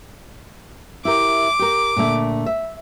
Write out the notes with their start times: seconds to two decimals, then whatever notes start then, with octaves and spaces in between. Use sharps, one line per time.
1.05 E4 G4 A#4 D6
1.59 G4 A#4
1.96 A#2 D3 A3
2.46 E5